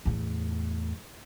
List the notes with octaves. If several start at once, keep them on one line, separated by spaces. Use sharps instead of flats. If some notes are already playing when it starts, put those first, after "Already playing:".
E2 A2